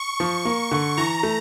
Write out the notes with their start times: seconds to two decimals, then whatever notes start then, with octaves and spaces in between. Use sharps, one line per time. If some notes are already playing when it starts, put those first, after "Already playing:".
Already playing: C#6
0.20 F3
0.45 A#3
0.71 D3
0.97 E3 A#5
1.23 A3